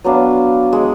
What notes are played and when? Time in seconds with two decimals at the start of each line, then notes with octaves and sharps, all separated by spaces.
0.04 F#3 B3 D4 F5
0.73 G#3